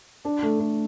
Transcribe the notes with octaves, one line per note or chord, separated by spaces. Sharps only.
D4
A3
A3